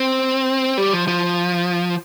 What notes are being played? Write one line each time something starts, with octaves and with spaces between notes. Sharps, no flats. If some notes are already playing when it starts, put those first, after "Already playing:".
Already playing: C4
G3
F3
F3